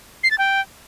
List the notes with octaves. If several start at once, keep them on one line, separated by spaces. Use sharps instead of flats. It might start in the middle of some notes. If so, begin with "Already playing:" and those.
C7
A6
G5